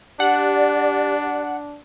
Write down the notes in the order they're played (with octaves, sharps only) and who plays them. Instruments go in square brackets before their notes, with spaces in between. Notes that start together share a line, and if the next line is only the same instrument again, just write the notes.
[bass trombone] D4 [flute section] G4 D5 [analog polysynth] F#5